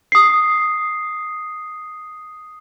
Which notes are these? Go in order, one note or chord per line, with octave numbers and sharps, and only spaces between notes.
D#6 C7